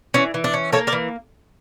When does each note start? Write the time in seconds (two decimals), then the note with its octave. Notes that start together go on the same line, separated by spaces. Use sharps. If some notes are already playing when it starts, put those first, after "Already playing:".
0.14 E3 C#4
0.34 E3
0.44 D4
0.54 C#4
0.72 A#3 A4 C#5
0.87 A#4 D5
0.92 E3